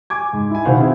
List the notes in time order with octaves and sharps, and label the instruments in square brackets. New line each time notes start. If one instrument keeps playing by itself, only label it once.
[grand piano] G#5 D6 G#6
G#2
E4 G#5
B2 D#3 E4 C5 F5 F#5
B3 C4 E4 G#4